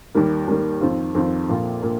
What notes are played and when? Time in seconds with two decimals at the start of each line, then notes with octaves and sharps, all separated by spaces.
0.15 D#2 D#3 G3 A#3
0.48 D#2 D#3 G3 A#3
0.81 F2 D#3 C4 F4
1.15 F2 D#3 C4 F4
1.49 A#1 A#2 A#3 F4
1.82 A#2 A#3 F4